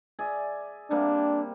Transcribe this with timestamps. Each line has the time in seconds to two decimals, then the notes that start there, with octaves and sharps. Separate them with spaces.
0.19 G#4 D5 E5
0.90 C3 G3 A#3 D4